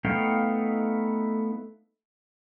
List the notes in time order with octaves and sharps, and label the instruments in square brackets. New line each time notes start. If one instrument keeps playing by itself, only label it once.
[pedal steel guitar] A3 B3 D#4 F5 G5